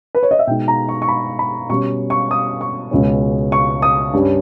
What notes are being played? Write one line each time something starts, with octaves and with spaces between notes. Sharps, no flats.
B4
C#5
D#5
E5
B2 G#3 D#4 G5
A#5
C#6
C#6
B5
B5
B2 G3 C#4 C#6
C#6
D#6
C#6
C#2 B2 G#3 C#4
C#6
D#6
G2 G3 C#4